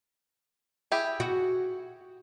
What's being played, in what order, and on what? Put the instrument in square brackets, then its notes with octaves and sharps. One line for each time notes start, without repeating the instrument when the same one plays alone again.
[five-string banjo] E4 G4 G#4
[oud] F#4